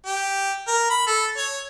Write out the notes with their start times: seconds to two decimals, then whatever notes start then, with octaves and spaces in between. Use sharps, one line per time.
0.06 G4
0.68 A#4
0.90 B5
1.07 A4
1.37 C#5